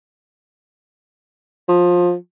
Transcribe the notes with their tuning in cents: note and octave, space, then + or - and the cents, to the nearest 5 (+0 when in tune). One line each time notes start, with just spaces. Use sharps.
F3 +20